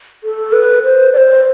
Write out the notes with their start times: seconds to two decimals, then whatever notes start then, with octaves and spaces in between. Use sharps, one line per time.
0.24 A4
0.53 B4
0.83 C5
1.13 D5
1.17 C5